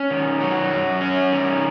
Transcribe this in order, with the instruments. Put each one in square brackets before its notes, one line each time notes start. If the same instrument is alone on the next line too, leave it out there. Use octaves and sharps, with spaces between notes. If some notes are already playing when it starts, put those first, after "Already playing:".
Already playing: [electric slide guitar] C#4
D#3
F#3
F#2
C#4
D#3